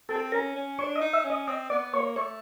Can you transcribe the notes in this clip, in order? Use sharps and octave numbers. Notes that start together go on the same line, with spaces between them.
C4 A4
C#4 A#4
C#4
D4 C#5
D#5
D#4
E5
C#4
D#5
C4 D#5
B3 D5
A#3 C#5
A3 C#5